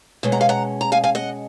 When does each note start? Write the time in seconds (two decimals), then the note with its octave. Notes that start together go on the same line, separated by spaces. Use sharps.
0.23 B2 G#3 C#4
0.32 F#5 A#5
0.41 F5 G#5
0.49 F#5 A#5
0.81 A#5
0.92 F5 G#5
1.04 F5 G#5
1.15 D#5 F#5